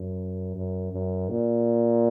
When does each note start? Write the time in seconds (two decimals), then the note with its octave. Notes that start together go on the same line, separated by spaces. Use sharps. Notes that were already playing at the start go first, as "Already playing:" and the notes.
Already playing: F#2
0.56 F#2
0.92 F#2
1.29 A#2